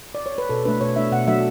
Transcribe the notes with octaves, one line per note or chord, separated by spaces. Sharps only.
D5
C#5
B4
B2 A4
A3 D4 B4
B2 C#5
A3 D4 E5
B2 F#5
F#3 A3 D4 E5